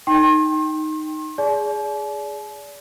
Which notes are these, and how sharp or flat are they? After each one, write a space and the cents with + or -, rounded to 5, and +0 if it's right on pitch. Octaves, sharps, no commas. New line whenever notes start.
D#4 +0 G5 +0 C6 +40
G#4 +0 D5 -25 A5 -45